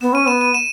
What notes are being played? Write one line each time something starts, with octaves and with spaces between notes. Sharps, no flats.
B3 E7
C#4 D#7
B3 E7
D#7
E7